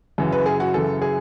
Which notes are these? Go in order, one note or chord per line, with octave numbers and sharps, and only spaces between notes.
F#2 C#3 E3
B4
G#4
F#4
F#2 C#3 E3 A4
G#4